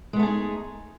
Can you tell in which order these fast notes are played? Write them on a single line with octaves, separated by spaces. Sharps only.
G#3 B3 A3 G#4 D#4